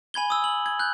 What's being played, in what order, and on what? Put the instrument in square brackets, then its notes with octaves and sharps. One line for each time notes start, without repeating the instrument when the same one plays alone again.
[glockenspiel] G#5 B5 G#6 G7
D#6 E6
F#7
G#6
F#6 G6